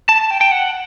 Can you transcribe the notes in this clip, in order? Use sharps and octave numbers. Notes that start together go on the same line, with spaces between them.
A5
G5
G5
F#5